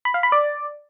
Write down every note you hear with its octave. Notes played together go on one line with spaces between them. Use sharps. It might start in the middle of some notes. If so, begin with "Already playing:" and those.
B5
F5
B5
D5